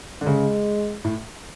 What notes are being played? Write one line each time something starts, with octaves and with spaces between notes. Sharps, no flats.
D3
C#3 G#3
A2